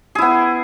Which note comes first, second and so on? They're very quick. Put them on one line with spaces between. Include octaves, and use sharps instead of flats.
G#4 E4 B3